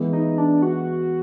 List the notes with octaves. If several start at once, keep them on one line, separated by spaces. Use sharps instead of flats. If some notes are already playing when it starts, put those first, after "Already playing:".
Already playing: E3 G#3 B3 E4
D#4
D4
F#4